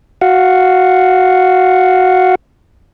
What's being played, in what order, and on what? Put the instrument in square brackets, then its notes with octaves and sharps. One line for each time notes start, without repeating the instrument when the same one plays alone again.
[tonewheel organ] F#4 F5 F#5